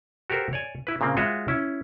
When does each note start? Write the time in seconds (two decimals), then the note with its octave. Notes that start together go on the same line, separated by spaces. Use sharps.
0.30 F#4 G4 A4 A#4 C5
0.53 C#5 D5 G#5
0.87 E4 B4
1.01 A#2 C#3 A#3 C4
1.17 G#3 F4 F#4 C#5 D#5 E5
1.48 C#4 E4